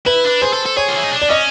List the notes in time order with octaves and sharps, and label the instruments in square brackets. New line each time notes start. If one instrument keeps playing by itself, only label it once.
[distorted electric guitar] E4 [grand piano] B4
[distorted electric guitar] D4
[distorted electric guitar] G#4 [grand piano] C5
[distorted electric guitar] A4
A4
[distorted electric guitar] G#4 [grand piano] C#5
[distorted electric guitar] F4
E4
D#4
D4
[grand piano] D5
[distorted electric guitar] C#4 [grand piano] D#5